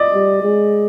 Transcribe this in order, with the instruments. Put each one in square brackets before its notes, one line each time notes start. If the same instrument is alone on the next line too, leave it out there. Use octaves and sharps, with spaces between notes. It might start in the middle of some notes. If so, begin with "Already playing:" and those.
Already playing: [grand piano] D5 D#5
[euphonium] G3
G#3